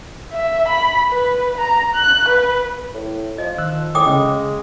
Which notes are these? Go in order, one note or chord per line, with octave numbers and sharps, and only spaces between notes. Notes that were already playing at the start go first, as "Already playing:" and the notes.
E5
B5
B4
A#5
F#6
B4
A2
F3 D#5
D#3 E6 F#6
A2 G5 D6 D#6
C#3 G#3